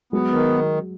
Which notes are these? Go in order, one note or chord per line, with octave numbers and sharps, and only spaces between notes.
F#3 G#3 B3
D#3